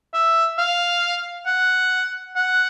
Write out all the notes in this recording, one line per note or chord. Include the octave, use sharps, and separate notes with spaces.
E5
F5
F#5
F#5